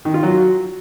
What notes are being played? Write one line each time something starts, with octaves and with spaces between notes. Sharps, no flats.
D#3
F4
F#3